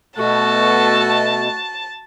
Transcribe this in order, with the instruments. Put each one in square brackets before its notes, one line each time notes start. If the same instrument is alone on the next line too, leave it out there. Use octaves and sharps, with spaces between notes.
[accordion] B2 [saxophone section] A3 [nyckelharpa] F#4 [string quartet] A5